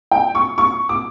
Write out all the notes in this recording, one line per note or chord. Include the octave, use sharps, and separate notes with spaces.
G5
C#6
C#6
D6